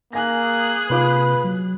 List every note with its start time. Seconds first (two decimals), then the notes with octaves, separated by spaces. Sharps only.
0.13 A#3 G#4 G#5 F#6 A#6
0.90 C3 A#3 F4 B4 D6
1.44 F#3